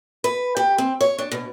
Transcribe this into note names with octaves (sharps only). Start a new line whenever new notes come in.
B4
G4
C4
C#5
D4
B2